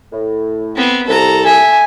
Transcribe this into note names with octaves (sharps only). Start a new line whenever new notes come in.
A2
B3 C4
C2 A4 A#5
E5 G#5